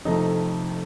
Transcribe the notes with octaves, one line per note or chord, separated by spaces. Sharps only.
F2 C3 F3 A3 D#4